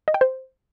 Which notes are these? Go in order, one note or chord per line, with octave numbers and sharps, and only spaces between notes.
D#5
G5
C5